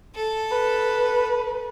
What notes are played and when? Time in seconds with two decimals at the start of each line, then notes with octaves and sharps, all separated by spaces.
0.15 A4
0.51 B4